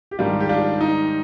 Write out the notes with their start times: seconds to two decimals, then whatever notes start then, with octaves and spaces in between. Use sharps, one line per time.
0.11 G4
0.19 G#2 D#3 G3 D4 F4
0.40 G4
0.49 D4 F4
0.81 D#4